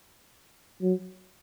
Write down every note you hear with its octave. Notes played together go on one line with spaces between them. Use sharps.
F#3